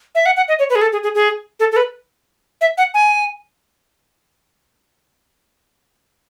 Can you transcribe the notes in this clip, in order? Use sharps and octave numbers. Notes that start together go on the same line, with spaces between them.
E5
F#5
F#5
D#5
C#5
B4
G#4
A4
G#4
G#4
G#4
A4
A4
B4
E5
F#5
G#5